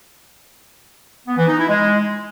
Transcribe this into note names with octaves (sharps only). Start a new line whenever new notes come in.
B3
E3
D#4
E4
G#3